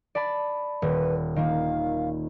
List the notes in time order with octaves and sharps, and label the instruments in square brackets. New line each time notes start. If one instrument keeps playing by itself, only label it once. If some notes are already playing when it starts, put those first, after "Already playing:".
[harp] D5 A5 B5
[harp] D#1 [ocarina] B4
[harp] D#3 A#3 [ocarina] F5